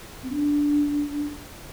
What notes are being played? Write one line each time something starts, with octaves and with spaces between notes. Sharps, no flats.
C4
D4